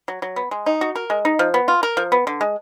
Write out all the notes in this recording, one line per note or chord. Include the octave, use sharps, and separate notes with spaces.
F#3
F#3
B3
G#3
D#4
F#4
A#4
G#3
D#4
F3
B3
F4
A#4
F3
B3
D3
G#3